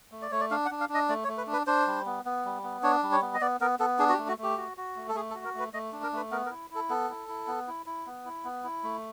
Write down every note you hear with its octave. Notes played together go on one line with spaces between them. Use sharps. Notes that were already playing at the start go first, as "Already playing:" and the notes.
A3
D5
A3 C#5
D5
D4 F5
F#5
D4
F5
D4
D#5
A3 D5
C#5
A3
B4
D4
B4
D4 C5
G3
B3
B3
G3
B3
D4 C#5
G3
C#5
B3
D#5
B3 D5
B3 A#4
B3 A4
D4 G#4
F#4
G4
A3
F#4
A3 G4
F#4
F#4
A3
A4
A3 G#4
A4
F#4
A#4
A3 B4
A3 D#5
D4
A#4
A3 B4
B3 A#4
A#4
E4
E4 A4
B3 A4
E4
E4
B3
E4
E4
B3
E4
B3
E4
A3